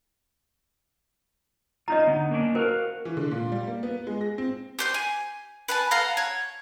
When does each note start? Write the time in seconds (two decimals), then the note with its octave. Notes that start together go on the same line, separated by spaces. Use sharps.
1.88 C#4 D#4 F4 D#5 A#5
2.07 D3 B3 D#4
2.31 A#3 C#4 D4
2.55 F#4 A#4 C5 E5 F5
3.05 E3
3.17 D3
3.31 A#2
3.52 G3
3.67 A#3
3.83 B3
4.07 G#3
4.21 A#6
4.38 C4
4.79 G4 C5 G6
4.94 G#5
5.68 B4 G#5 A5
5.91 A4 F5 F#5 A#5
6.17 C#5